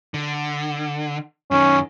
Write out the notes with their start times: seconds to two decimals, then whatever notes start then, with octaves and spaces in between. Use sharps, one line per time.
0.14 D3
1.51 F#2 D#3 C#4